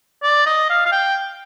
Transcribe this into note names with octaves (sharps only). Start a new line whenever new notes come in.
D5
D#5
F5
F5
G5